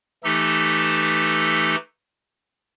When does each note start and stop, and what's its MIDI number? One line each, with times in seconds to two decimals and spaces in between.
0.24 1.76 52
0.24 1.76 57
0.24 1.76 63
0.24 1.76 67
0.24 1.76 69